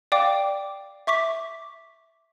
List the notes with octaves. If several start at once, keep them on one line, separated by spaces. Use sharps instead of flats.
D5 F5 G5 D6
E5 C#6 D6 B6